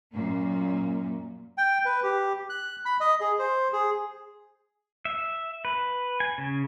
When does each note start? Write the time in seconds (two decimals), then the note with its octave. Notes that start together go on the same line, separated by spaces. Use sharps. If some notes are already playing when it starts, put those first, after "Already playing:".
0.13 F#2 A#2 A#3
1.58 G5
1.85 B4
2.03 G4
2.50 F#6
2.85 B5
3.00 D#5
3.21 G#4
3.39 C5
3.73 G#4
5.05 E5
5.65 B4
6.20 G#5
6.38 C#3